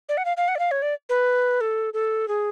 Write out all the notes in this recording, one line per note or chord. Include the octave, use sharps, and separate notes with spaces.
D5
F#5
F5
F5
F#5
D5
F5
C#5
D5
B4
A4
A4
G#4